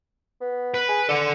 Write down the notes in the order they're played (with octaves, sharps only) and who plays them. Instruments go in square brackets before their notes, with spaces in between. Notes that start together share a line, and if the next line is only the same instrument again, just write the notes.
[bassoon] B3
[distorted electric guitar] B4
[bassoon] G#4
[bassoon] D3 [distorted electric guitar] A4 F#5